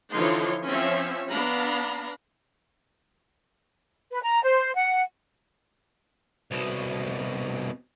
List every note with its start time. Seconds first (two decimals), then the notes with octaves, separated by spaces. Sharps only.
0.12 D3 E3 F3 D#4 C#5 C6
0.68 F3 C4 C#4 C#5 E5
1.30 B3 D4 F5 A#5 B5
4.11 B4
4.23 A#5
4.43 C5
4.75 F#5
6.51 C2 B2